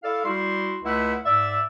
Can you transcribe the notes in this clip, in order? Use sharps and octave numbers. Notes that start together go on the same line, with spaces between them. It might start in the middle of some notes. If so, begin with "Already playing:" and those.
E4 A4 D5 F5
G3 E4 F#4 C6
C#2 G#3 A3 E4 E5 F#5
G#2 D5 E5 E6